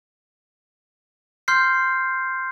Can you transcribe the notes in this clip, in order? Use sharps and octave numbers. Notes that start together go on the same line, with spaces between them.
C6 F6 G6 C7